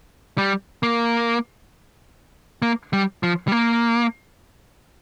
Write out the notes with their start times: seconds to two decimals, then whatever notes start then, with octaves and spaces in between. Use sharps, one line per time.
0.38 G3
0.83 A#3
2.62 A#3
2.93 G3
3.23 F3
3.48 G3
3.52 A#3